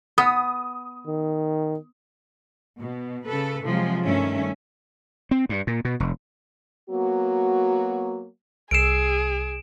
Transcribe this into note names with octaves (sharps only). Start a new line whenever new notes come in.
B3 D#6
D#3
B2
C#3 A4 B4
C3 F3 F#3 G#3 F4 G#4
G2 D#3 A3 C#4 E5
C4
G2
A#2
B2
F1
F#3 A#3 B3 F#4
C2 G#4 E6 C7 D7 E7